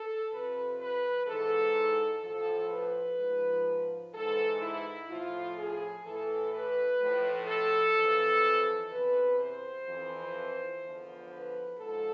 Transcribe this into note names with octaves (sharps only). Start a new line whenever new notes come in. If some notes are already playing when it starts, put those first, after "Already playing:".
Already playing: A4
F2 C3 F3 B4
B4
G#2 E3 A4
A2 F3 A4
B4
G#2 F3
G#2 E3 A4
E4
A2 F3 F4
G#4
A2 E3 A4
B4
A2 F3
A4
F2 E3
E2 C3 E3 B4
C5
F2 E3
E2 D3 F3
B4
G#2 F3 A4